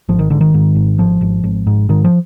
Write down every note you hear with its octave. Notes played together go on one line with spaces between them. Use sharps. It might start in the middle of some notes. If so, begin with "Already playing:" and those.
G#1 F3
D#3
G#2 D3
D#3
G#2
G#1
G#1 F3
G#1
G#1
G#2
G#2 D#3
F3